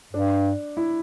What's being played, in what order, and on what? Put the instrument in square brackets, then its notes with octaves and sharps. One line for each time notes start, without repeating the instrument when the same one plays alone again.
[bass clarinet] G2 [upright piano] D4
[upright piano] E4